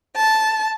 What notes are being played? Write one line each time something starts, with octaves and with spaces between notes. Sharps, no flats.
A5